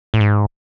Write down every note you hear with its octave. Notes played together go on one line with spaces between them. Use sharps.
A2
G#2